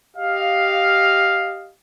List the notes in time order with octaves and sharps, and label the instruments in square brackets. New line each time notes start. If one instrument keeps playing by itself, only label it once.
[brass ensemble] G4 D#5 F5